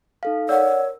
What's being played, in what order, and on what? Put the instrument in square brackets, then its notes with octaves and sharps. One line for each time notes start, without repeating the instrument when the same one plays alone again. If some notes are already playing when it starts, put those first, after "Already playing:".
[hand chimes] D#4 A4 F5
[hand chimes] A#4 E6 [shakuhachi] C#5 [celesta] D5 F#5